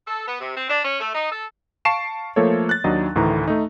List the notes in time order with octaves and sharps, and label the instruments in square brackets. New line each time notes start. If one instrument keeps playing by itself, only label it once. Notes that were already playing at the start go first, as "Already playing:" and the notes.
[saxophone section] A4
B3
C3
C4
D4
C#4
A3
D#4
A4
[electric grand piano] F5 A5 C#6 C7 D7 E7
F3 A3 A#3 A4 C#5
F#6 A6
D#2 F#3 D4 D#4 D#5
D2 A2 D#3 E3 A#5
A3 D#4